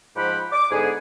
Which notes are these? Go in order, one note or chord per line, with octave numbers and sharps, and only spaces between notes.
G#2 F3 G4 F#5 B5
D6
G#2 D3 B3 G#4